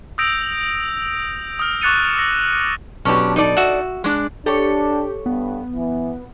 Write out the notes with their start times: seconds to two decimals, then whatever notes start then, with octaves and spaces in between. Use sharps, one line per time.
0.18 D#6 E6 G6 A#6 D7 F7
1.59 D#6 F6
1.82 C#6 D6 F#6 A6 C#7 D#7
2.17 E6 A#6
3.05 B1 B2 C#4 D4 G4
3.36 D#4 A4 D5
3.57 F#4 E5 F#5
4.04 G#3 D4
4.46 D4 G4 A4 C#5
5.26 G2 B3
5.76 E3